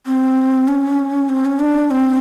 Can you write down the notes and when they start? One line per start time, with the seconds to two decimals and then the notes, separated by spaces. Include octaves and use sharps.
0.06 C4
0.68 C#4
1.29 C4
1.45 C#4
1.59 D4
1.91 C4